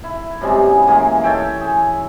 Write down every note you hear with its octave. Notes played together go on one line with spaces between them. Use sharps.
E4
F#2 C3 G3 G#3
B3 G#4
E3 G#3 A#3 G#5
A4 C#5 E5 G5
G#4